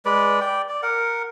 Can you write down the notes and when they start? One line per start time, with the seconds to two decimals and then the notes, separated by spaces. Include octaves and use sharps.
0.05 G#3 B4 D5
0.41 D5 G5
0.69 D5
0.83 A#4 F#5